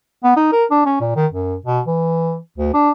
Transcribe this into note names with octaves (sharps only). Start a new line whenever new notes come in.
B3
D#4
A#4
D4
C#4
A#2
D#3
F#2
B2
E3
D2
D4